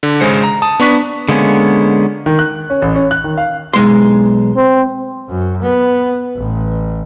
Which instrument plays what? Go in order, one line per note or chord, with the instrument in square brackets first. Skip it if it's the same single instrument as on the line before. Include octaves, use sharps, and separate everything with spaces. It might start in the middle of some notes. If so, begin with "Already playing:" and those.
[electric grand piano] D3
G#1 C#3 G#3 C5 C#7
A#5
A5 D#6
B3 D4 C#6 B6
[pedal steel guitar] D3 G#3 A#3 B3 C#4
[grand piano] D#3
F#6
C#4
A1
C#4
F#6
D#3
F5
[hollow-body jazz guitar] B1 G#3 C6
[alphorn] C4
[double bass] F#2
B3
A1